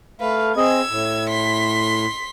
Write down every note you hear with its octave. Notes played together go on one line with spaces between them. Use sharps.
A3 B4 F5
C4 G#4 D#5 E6 G#6
A2
C6 B6